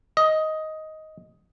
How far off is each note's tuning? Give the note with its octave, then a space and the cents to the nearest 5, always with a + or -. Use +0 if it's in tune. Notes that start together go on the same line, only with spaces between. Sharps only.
D#5 +10